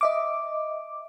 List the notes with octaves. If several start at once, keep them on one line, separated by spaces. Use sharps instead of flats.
D#5 E5 D6